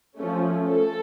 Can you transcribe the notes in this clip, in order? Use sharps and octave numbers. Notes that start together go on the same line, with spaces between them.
F3 A3 C#4
A4